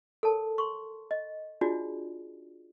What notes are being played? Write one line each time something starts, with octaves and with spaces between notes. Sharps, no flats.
A4 A#4 C#5 A5
C6 C#6
D#5
D4 D#4 F4 F#4 G#4 D5